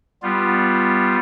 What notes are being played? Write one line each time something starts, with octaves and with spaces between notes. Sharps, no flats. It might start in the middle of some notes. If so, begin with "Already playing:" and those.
G3 B3 F4